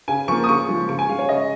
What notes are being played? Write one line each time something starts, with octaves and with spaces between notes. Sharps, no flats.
C#3 G#5
F3 A#3 C#6
D#6
C#3 C#6
F3 G#3
C#3 C#6
G#5
G#3 F5
C#5
C#3 D#5